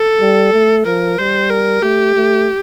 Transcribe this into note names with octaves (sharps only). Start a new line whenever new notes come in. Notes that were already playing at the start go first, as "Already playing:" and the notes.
Already playing: A4
G3
A3
F3 A#4
G3 C5
A#4
A3 G4
A3